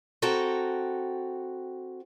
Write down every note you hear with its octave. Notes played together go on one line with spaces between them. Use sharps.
C4 F#4 A4 F#5 G5 A#5